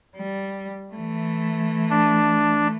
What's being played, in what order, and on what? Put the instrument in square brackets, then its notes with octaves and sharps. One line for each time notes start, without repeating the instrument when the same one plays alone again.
[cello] G3
E3 A3
[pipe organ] D4